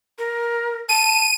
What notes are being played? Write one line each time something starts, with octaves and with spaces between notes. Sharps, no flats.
A#4
A5 D#7